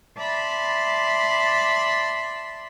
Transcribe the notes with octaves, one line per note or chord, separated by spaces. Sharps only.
D5 E5 A5 B5 C6